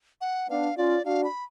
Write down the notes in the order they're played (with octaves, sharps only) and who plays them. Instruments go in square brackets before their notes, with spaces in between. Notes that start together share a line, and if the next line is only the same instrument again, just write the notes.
[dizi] F#5
[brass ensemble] B3 D4 [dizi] F5
[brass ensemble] C#4 F4 [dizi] D5
[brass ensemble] D4 F#4 [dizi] F5
[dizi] B5